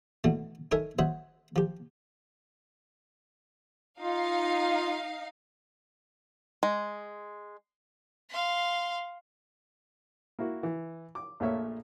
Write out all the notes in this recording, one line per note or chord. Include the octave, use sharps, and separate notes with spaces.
B2 D3 E3 A3
D#4 A4 A#4 C#5 E5 G#5
F#4 C5 C#5 D#5 E5
F3 G4
D#4 F4 F5
G#3
F5 C6
A#3 E4 F#4
E3
D6
A#1 A#2 A3 C#5 E5